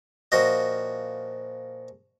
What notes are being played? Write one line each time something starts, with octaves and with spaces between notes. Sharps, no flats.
A#2 F3 F#4 D#5